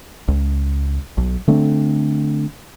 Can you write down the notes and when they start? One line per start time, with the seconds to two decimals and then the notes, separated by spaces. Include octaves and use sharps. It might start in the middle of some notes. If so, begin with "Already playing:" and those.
0.28 C#2
1.17 B1
1.48 D3 A3 C4 D4